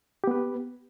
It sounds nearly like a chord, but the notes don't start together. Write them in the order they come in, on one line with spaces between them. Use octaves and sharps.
G4 B3 B4